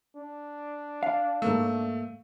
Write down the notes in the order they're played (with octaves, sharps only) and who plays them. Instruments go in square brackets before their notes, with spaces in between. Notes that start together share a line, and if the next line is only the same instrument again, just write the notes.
[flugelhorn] D4
[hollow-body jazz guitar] F5
[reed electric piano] G#2 A#3 E6 [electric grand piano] A3